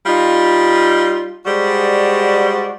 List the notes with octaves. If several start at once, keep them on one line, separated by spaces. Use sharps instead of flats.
G3 D#4 F4
G3 G#3 F#4 C5 D5